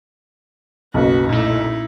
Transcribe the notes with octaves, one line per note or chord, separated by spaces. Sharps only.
F#1 B1 F#4 B4
A#2 A3 D#4 E4